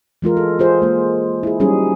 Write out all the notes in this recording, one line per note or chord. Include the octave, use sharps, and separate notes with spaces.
E3 G#3 F4 A#4
A4
F4 G#4 C5
G#3 A#3
E4 G#4
F#3 G3 C#4 D#4 G#4